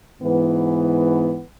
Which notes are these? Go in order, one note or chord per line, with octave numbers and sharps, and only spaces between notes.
G#2 E3 B3